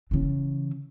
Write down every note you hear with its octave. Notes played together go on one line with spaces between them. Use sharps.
C#3 E3